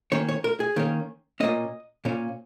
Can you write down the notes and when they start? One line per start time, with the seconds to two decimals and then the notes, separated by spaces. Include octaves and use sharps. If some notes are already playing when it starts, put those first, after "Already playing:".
0.12 D#3 A#3 C#4 C#5
0.29 C#5
0.44 A#4
0.60 G#4
0.76 D#3 A#3 C#4
1.40 A#2 A#3 C#4 D#5
2.05 A#2 A#3 C#4